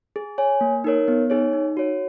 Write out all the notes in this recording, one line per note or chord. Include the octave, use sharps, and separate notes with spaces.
G#4
C#5 G#5
A#3
D#4 A#4 C#5
B3
D#4 G#4 C#5
D#4
F#4 C#5